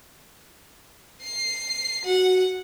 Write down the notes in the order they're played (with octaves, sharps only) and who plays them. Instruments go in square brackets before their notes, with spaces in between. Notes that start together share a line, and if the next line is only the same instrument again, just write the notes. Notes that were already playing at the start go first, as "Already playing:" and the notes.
[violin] C7
[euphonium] F#4 [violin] F#5